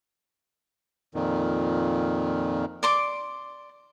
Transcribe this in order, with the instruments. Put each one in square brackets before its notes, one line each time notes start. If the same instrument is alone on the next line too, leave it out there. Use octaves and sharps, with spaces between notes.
[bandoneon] F2 A#2 D#3
[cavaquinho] D5 C6 D6